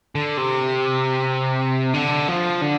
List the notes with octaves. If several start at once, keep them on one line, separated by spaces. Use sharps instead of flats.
D3
C3
D3
F3
D3